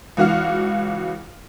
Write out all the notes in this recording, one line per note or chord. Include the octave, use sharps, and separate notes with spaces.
C#2 E3 F#4 F5 F6